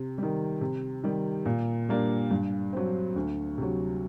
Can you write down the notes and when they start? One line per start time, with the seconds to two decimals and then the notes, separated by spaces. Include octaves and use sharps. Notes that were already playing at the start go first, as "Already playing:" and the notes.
Already playing: C3
0.18 D#3 G3
0.61 C3
1.04 D#3 G3
1.46 A#2
1.89 G3 A#3 D4
2.31 G2
2.73 F#3 C4
3.16 D2
3.58 C3 F#3